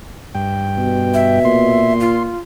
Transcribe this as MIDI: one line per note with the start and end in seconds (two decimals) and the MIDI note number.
0.35 1.39 43
0.35 1.39 79
0.78 2.01 47
1.14 1.93 76
1.45 2.34 46
1.45 2.23 84
2.00 2.40 65